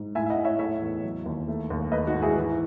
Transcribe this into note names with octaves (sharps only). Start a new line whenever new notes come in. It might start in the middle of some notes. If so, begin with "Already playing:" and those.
Already playing: G#2
A2 E5 G#5
E5
D#5 F#5
A2
C#5 E5
A3 C#5 E5
E2
F#3
D#2
A3
D#2
A3 B4 D#5
D#4 F#4
G#2
E4 G#4
E3